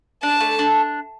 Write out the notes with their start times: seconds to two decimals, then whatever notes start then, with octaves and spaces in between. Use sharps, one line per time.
0.23 D4 A5
0.40 A3
0.59 D4